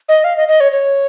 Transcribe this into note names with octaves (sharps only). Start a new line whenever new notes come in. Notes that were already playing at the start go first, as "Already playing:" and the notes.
D#5
F5
D#5
D#5
C#5
C#5